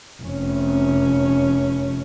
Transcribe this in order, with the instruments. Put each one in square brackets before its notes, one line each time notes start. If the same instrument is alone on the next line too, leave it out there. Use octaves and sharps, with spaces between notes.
[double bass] F1 C#4